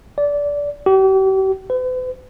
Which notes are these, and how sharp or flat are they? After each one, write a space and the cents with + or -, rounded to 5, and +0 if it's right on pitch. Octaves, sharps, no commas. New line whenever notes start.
D5 -20
G4 -40
B4 +45